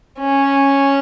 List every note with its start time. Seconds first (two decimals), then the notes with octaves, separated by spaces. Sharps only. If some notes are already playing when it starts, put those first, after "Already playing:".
0.19 C#4